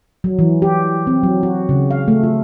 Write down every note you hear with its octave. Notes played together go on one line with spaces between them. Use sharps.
F#3
E3
G4
C4
F#3
F#4
C#3
F5
A3
F4